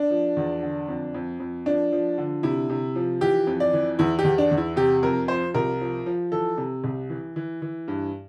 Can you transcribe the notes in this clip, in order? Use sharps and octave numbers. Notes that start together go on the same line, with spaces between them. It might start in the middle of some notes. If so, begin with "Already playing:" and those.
Already playing: D4
F3
E2
D3
F2
F2
F2
F3 D4
F3
D3
C3 E4
C3
F3
E3 G4
F2
D5
E3
E2 E4
G4
E2
D4
E2
E4
C3 G4
F2 A#4
F3 C5
C2 A#4
F3
F3
E3 A4
C3
C2
E3
E3
E3
G2